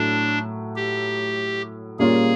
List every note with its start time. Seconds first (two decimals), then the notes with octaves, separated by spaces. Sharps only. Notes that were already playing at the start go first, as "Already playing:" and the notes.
Already playing: A2 F#3 A3 D4
0.76 G4
1.99 A#2 G3 A#3 C#4 F4 G#4